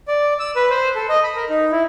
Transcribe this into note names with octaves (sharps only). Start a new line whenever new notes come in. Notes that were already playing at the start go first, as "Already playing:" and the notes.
D5
E6
B4
C5
A4
D#5
B5
A#4
D#4
E4